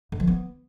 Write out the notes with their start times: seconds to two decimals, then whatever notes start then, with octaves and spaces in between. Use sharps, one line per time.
0.12 D3
0.20 F3
0.27 B3